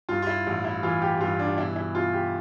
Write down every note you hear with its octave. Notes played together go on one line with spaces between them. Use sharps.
G2 F4
F4
E4
A1
E4
E3 F4
G4
G2 F4
D4
B2 E4
E4
B2 F4
G4